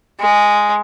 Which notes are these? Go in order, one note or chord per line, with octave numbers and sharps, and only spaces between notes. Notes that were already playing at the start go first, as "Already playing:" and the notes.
G#3